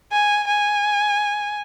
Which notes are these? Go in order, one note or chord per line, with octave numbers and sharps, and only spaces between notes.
G#5
G#5